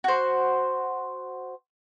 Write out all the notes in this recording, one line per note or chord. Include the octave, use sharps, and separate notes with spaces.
F#4 C5